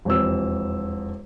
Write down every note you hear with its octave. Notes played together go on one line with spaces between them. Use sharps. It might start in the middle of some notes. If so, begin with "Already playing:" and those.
E1 F2 E6